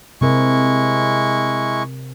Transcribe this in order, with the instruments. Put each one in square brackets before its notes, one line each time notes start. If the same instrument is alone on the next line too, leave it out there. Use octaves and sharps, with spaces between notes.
[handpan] C3 C4 A#4 [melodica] G#3 E4 C#6